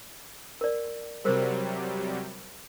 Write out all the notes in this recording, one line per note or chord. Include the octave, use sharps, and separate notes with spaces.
A#4 D5
C3 F#3 G3 G#4 A#4 C5